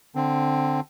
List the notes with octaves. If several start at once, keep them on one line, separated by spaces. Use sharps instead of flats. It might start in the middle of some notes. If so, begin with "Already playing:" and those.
D3 C4